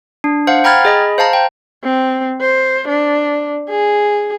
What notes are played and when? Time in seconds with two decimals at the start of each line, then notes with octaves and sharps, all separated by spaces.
0.24 D4
0.47 C5 F5 F#5
0.64 G5 A#5 B5 F6 G#6 A6
0.85 G#4 D#5 B5
1.18 C5 F5 A5 A#5
1.33 G5
1.84 C4
2.41 C5
2.88 D4
3.70 G#4